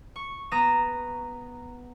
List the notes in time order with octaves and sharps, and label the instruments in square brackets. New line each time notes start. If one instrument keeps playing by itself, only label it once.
[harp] C#6
B3 A#5 D#6 A#6 E7